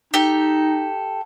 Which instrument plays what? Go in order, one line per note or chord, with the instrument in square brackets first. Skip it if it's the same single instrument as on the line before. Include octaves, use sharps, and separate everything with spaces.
[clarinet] D#4 [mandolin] G4 A4